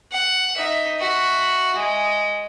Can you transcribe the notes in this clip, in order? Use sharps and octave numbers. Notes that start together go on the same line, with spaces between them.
F#5
D#4 E5
F#4 E5
G#3